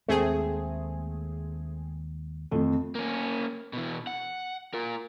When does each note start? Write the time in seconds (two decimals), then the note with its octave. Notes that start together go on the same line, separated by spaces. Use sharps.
0.08 D#2 G#3 A3 C4 G#4
2.51 F2 D#3 E3 A3
2.95 A#3 C#4
3.73 B2 E3
4.07 F#5
4.74 F4 A#4